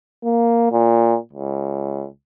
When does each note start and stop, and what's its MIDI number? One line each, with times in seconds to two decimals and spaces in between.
0.24 0.72 58
0.72 1.17 46
1.33 2.06 37